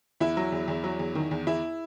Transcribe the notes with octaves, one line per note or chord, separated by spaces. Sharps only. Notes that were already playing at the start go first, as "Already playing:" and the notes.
E2 E4
F#3
E2
E2
F#3
E2
D#3
E2
E2 E4